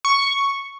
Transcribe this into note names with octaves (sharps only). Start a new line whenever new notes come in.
C#6